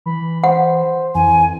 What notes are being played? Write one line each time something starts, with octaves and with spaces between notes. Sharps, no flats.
E3 B5
C5 F#5
F2 E3 G#5